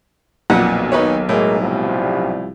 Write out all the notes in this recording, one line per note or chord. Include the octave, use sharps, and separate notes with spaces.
B1 F2 A#2 F#5
D#2 D#4 B4 C#5
A2 G#3 A#3
C2 F3 G3